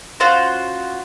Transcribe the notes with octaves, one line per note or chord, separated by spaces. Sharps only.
C#4 F4 F#4 C5